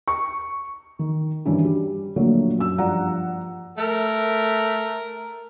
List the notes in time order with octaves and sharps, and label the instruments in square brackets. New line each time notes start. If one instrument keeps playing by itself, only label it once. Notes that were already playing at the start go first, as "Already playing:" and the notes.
[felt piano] C#6
D#3
G2 D#3 E3 C#4 D4 E4
G3
A#2 D3 F3 F#3 A3 A#3
F#2 E6
G2 F3 D5 F#5 A#5
[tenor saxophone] A3 [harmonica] A#4